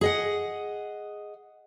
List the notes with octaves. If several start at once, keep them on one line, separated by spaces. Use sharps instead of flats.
G#4 D#5 F#5